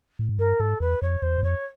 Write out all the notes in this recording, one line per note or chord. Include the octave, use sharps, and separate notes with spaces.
A2
G#2
G2 A#4
G#2 A4
E2 B4
F2 C#5
E2 C5
F#2
F2 C#5